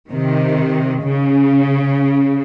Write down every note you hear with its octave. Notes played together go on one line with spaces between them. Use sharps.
C3 D#3
C#3